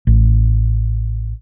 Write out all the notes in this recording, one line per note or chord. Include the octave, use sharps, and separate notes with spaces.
A1